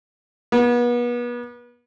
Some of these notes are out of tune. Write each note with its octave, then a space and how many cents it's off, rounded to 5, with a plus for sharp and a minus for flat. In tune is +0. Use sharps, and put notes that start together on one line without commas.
B3 -35